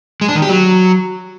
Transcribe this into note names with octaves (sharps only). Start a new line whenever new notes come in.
G#3
D4
D#3
G4
F#3